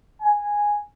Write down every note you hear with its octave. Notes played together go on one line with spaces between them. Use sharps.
G#5